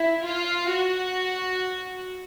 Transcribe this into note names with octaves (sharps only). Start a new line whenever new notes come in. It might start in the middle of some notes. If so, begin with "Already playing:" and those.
Already playing: E4
F4
F#4